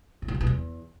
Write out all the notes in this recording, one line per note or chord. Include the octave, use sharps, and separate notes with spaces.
G#2
B2
G2
B2
E2